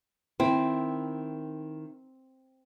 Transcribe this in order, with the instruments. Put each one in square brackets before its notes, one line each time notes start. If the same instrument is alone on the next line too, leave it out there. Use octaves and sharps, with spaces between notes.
[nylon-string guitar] D#3 E4 [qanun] C4